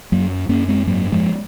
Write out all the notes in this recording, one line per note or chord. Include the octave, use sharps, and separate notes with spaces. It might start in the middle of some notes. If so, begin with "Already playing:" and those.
F#2 F#3 A#3
F#2 A#3 C#4
G#3 C4
G#2 F#3 A#3
F3 G#3